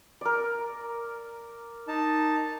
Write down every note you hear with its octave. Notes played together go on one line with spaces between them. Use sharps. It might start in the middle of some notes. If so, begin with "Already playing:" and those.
A#4 D5
D#4 A5